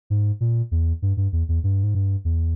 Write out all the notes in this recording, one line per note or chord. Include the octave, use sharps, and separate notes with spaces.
G#2
A#2
E2
G2
G2
E2
E2
G2
G#2
G2
E2